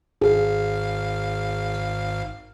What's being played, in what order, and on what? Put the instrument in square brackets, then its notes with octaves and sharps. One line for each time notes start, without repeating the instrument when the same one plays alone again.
[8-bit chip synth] G#1 F5 [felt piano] G#4